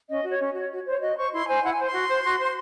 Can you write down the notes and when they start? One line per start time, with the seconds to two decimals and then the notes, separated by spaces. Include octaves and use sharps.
0.09 C#4 D#5
0.24 F#4 C#5
0.40 C#4
0.54 F#4 C#5
0.70 F#4
0.85 C5 C#5
1.01 F#4 D#5
1.17 C5 C#6
1.31 E4 C6
1.47 C5 G#5
1.62 E4 F#5
1.73 C5 G#5
1.84 C6
1.93 F#4
2.09 C5
2.24 F#4
2.39 C5